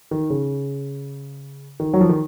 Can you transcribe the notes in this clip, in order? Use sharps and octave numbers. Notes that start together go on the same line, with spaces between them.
D#3
C#3
D#3
F#3
F3
D#3